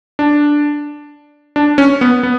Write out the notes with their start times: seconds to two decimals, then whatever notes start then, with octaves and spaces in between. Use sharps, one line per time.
0.19 D4
1.56 D4
1.78 C#4
2.01 B3
2.23 B3